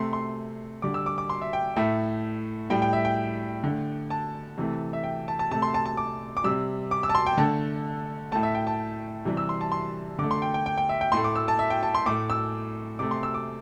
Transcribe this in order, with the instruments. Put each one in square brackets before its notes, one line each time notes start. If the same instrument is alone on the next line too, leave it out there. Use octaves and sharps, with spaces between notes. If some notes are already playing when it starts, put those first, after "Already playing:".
Already playing: [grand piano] C3 A3 C6
C6
D3 G3 D6
E6
D6
D6
C6
E5
G5
A2 A3 E5
A2 G3 G5
G5
E5
G5
D3 A3
A5
C3 E3 A3
E5
G5
A5
A5
C3 A3 A5
C6
A5
A5
D6
D6
C3 G3 E6
D6
E6
A5
C6
G5
D3 A3 A5
A2 A3 A5
E5
G5
A5
C3 E3 G3
E6
C6
A5
C6
D3 A3 D6
C6
G5
G5
G5
G5
E5
G5
A2 A3 C6
D6
E6
A5
E5
G5
A5
C6
A2 A3 D6
E6
C3 A3 D6
C6
E6
D6